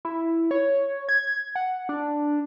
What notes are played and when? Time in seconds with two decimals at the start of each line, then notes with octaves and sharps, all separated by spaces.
0.05 E4
0.51 C#5
1.09 G#6
1.55 F#5
1.89 D4